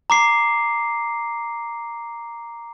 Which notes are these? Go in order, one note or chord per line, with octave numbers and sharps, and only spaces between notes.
A#5 D6 C7